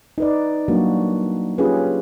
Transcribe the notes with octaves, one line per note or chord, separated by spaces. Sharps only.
D#4 B4 D5
F#3 G3 A#3 D4 F#4
C#4 F4 G4 G#4 B4